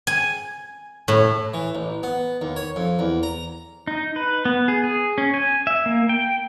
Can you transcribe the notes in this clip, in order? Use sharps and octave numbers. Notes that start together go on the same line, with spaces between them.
G#5
A2
E3
A1
B3
D#2
C#5
F2
E2
A#5
D#4
B4
B3
G#4
G#4
C#4
G#5
E5
A#3
G5